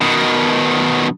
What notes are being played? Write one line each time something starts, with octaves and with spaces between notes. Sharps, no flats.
B2 D#3